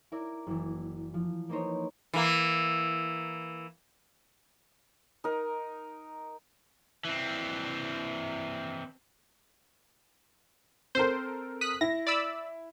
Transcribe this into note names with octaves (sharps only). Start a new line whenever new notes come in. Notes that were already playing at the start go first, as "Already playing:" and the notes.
E4 A#4 D5
F#1 E3
F3
A#3 B3 D#4 A#4 C5 C#5
E3 A#3
D#4 A#4
E3 C4
C4 A4 A#4 C5
D#6 F#6 B6
E4 A#6
D5 B5 E6